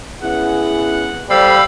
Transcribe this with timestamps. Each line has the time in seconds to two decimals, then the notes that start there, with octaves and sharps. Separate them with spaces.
0.22 B3 C#4 E4 G#4 F#5
1.30 G3 A4 C5 D5 F5 B5 E6